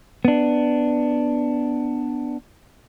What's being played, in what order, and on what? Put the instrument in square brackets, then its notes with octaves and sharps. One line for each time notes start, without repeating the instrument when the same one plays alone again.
[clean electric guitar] B3 D4